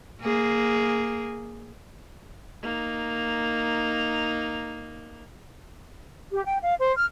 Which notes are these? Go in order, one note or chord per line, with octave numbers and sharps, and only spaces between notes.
A#3 G#4
A#3 D#4
G4
G5
F5
C5
F6